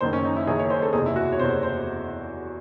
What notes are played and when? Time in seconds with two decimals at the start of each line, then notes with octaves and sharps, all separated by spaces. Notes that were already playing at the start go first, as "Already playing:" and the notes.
0.01 F#1 F#2 D#3 C5
0.13 C#4
0.25 D#4
0.36 E4
0.47 F#1 F#2 D#3 G#4
0.59 C#5
0.70 C5
0.82 A4
0.93 F#1 E2 C3 G#4
1.06 E4
1.16 F#4
1.32 C#5
1.39 F#1 E2 C3 C5
1.63 C5